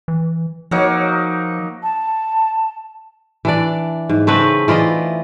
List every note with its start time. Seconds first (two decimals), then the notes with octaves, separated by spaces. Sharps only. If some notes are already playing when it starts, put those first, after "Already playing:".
0.08 E3
0.71 F3 F#3 A#3 D#4
1.83 A5
3.45 E3 D4 D5
4.09 G#2
4.27 C#3 A3 C4 B4
4.68 E3 F4 D5 D#5